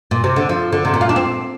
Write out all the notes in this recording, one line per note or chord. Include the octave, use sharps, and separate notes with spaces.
A#2
C3
D3
F3
D3
C3
A#2
F4
D4
C4